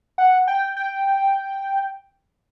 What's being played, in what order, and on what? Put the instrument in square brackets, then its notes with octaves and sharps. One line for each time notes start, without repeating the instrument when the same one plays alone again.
[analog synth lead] F#5
G5
G5